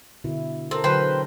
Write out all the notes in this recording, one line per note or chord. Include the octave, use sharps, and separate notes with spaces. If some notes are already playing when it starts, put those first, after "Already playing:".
B2 D3 E4
C4 A4 A#4
D3 F#3 B4 C5 G5